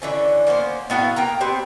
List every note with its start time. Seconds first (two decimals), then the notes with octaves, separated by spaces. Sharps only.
0.02 D3 E3 C#4
0.47 A#3 B3 C#4 C5
0.90 A2 B3 F#4 F5
1.16 A#3 G5 A#5
1.40 B3 C4 G4